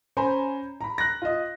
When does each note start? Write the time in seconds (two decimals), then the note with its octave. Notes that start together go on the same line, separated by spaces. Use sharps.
0.17 C#4 C5 G#5 A#5 B5
0.81 A#5 B5
0.98 F#6 A#6
1.22 F4 D#5